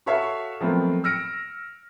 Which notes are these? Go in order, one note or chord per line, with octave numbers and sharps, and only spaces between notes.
F#4 A4 C#5 E5 F5
D#3 F3 F#3 A3 B3 C4
E6 F6 A#6 C#7 D7